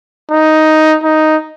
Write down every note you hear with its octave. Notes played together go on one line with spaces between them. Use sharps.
D#4
D#4